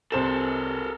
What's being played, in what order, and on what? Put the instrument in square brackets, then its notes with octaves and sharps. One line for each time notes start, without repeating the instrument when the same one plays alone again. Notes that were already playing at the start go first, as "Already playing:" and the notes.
[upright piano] C2 C5 E7 [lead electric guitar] A4 A#4